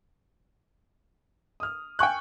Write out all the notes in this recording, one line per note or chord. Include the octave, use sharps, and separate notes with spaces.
D#6 F6
G5 G#5 C#6 F#6